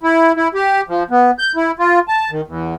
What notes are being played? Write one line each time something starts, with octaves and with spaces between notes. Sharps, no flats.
E4
E4
G4
F3
B3
G6
E4
F4
A5
D#3
E2